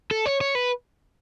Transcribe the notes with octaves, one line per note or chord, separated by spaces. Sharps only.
A4
C#5
C#5
B4